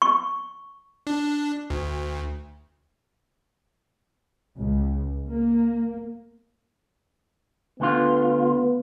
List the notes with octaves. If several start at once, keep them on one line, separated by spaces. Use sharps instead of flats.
C#6
D4
D2
C#2
A#3
D2 D3 B3 F4